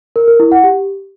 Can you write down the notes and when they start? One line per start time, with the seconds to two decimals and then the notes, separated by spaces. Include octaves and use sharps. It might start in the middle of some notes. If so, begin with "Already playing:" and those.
0.16 A#4
0.28 A#4
0.40 E4
0.52 F#5
0.64 G4